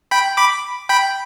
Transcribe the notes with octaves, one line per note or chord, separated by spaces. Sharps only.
G5 B5
B5 D6
G5 B5